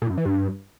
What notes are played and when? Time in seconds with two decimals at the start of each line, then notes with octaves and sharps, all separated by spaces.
0.02 A#2
0.10 F#2
0.18 E3
0.26 G2